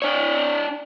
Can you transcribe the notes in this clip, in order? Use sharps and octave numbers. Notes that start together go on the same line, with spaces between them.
D4 C#5